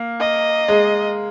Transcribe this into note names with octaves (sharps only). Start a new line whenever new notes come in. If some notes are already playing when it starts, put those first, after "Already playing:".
Already playing: A#3
D#5
G#3